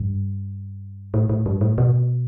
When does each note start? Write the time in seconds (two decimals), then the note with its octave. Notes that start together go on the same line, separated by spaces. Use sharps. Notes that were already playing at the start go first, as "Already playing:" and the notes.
Already playing: G2
1.14 A2
1.29 A2
1.46 G2
1.61 A2
1.78 B2